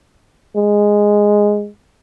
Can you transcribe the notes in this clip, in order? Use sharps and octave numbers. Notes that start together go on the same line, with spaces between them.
G#3